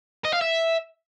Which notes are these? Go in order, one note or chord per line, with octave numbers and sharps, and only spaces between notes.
D#5
F5
E5